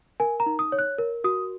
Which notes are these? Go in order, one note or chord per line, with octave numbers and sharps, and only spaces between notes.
A#4 G#5
A#5
D#4
D#6
C#5
F#6
A#4
F#4 D#6